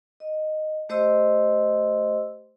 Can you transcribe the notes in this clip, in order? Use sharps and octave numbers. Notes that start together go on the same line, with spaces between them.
D#5
A3 G4 C5 D#5 C6 E6